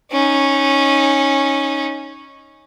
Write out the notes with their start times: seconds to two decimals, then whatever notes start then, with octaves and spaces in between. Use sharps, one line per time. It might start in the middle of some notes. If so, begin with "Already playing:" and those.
0.12 C#4 D#4